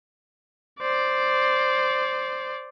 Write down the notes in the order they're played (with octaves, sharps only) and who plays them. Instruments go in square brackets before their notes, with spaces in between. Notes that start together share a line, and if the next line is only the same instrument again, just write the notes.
[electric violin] C5 D5